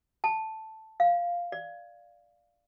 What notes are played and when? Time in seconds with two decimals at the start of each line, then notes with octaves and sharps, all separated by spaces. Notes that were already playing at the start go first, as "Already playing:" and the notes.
0.24 A5
1.00 F5
1.52 D5